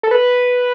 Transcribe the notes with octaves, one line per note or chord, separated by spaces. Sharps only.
A4
B4